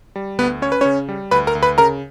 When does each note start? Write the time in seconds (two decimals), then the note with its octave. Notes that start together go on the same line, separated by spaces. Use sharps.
0.16 G3
0.39 D2 B3 B4
0.62 C#4 C#5
0.72 B4
0.81 C#3 C#4 C#5
1.09 G3
1.31 D2 B4 B5
1.47 A#4 A#5
1.55 D2
1.63 B4 B5
1.78 C#3 A#4 A#5